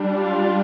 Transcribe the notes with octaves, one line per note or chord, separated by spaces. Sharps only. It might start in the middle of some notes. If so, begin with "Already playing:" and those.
Already playing: G3 D4
F4